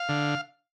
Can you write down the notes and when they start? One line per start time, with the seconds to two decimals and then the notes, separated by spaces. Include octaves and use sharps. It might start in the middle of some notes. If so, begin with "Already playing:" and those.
Already playing: F5
0.09 D3